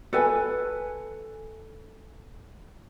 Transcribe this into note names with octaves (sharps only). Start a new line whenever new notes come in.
A4 B4 G#5